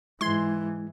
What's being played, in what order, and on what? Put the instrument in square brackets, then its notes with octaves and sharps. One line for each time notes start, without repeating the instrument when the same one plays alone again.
[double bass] G#2 E3 [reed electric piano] G#3 E4 G#6 [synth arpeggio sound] C6